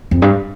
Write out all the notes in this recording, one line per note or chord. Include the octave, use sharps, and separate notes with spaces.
F2
G2